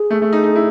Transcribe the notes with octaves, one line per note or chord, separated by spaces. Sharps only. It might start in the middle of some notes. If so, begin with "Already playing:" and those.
Already playing: G#4
A3
A3
D#4
D#4
E4